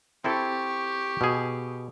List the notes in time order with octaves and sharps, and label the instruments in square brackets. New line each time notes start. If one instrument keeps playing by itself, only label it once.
[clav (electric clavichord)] C4 E4 A4 [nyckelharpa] G4 C#6
[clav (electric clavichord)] B2 G#4